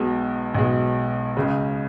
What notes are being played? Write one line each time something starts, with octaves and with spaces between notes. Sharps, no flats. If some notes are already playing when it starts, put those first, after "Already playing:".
Already playing: B1 B2 G#3
B1 B2 G#3
C#2 C#3 G#3